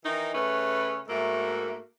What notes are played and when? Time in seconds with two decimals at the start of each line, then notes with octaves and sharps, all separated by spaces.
0.05 D#3 E3 D#4
0.35 C#3 A3 C#4 B4
1.09 G#2 A3 A#3 F#4 E5